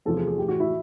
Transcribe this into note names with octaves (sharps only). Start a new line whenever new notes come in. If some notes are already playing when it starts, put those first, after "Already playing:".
E2 C3 F3 A4
G#4
G#4
A2 E3 G4
F#4
E4